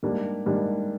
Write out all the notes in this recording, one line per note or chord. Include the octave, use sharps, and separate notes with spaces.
G#2 G3 A#3 D4
G#2 G3 A#3 D4